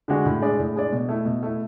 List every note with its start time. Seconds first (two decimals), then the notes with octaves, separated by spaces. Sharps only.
0.08 D3 G#3 D4 F#4
0.26 A2
0.41 G#3 D4 G#4 D5
0.59 A2
0.76 G#3 D4 G#4 D5
0.92 B2
1.09 A3 E4
1.25 B2
1.43 A3 E4